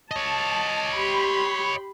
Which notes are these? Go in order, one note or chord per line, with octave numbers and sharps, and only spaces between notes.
C#5 D#5 A5
G4 B5 C6